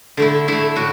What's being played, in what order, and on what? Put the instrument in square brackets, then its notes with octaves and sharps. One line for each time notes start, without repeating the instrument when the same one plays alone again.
[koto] D3 A3 E4
D3 A3 E4
A2 F#4